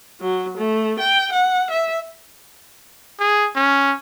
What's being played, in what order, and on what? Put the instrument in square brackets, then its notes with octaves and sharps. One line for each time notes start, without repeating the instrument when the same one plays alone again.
[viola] F#3
A3
G5
F#5
E5
[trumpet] G#4
C#4